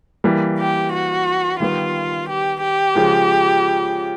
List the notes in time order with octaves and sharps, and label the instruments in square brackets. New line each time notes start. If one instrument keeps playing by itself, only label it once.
[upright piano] E3 G3 A#3
[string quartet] G4
F#4
[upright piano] D#3 G3 B3 [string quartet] F4
[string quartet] G4
G4
[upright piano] C#3 F3 G#3